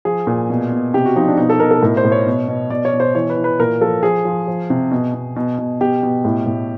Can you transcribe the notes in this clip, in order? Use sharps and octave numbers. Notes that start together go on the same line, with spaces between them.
F3 G#4
A#2
B2
B2
C3 G4
F#4
F3 D#4
D4
B2 D#4
A4
B2 A#4
A4
A2 A#4
C5
A2
C#5
B2
B2
B2 D5
C#5
B2
C5
E3 C#5
B4
E3
B4
A#2 A#4
F3 A4
F3 G#4
F3
F3
C3
B2
B2
B2
B2
B2 G4
B2
A2
A2